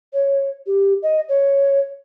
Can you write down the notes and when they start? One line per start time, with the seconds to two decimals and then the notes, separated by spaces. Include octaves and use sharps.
0.13 C#5
0.67 G4
1.03 D#5
1.29 C#5